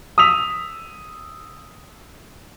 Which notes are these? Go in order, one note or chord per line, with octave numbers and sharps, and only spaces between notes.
D#6 E6 B6 F7